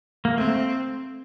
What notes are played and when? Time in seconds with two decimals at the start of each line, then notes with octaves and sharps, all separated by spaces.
0.25 A#3
0.37 A3 C4